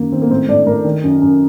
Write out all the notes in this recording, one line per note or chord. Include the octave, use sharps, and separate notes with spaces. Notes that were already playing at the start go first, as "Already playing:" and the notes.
Already playing: F#2 D#3 A#3
D#3 C4
A#3
A2 C4
A2 D4
A2 A#4
D#3
F#2
F#2